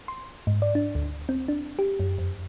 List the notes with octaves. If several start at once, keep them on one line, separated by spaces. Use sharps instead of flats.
C6
G#2
D5
D4
D2
C4
D4
G4
F#2
F2